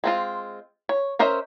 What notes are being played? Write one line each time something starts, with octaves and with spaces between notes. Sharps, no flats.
G#3 C4 F4
C#5
C#4 A#4 C5 D#5 E5